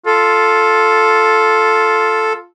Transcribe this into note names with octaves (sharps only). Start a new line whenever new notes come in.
F4 A4